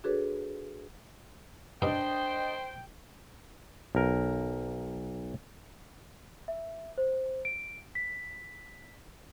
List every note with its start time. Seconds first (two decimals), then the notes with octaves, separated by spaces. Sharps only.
0.04 D4 F#4 G#4 A4 B4 C#5
1.82 G2 D4 C5 D#5 G5
3.95 B1 A#4
6.48 E5
6.98 C5
7.45 D7
7.95 B6